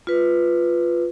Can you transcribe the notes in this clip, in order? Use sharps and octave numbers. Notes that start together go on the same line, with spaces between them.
F4 B4